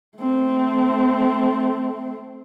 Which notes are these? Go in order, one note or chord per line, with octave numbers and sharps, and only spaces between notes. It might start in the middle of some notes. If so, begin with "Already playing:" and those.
A3 C4